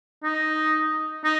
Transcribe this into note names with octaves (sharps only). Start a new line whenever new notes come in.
D#4
D#4